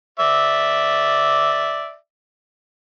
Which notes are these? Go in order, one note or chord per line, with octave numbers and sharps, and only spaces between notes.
D5 E5